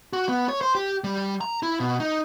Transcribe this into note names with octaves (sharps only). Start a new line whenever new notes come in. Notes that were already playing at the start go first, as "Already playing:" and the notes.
F#4
B3
C#5
C5
G4
G3
A#5
E4
B2
D#4